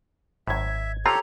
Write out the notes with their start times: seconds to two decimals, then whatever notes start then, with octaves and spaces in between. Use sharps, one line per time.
0.47 G#1 F#2 A2 E5 G#6
1.05 C3 C4 F4 G4 A4 C#5 A#5